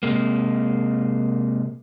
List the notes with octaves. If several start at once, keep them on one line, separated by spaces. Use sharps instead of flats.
C3 G#3 A#3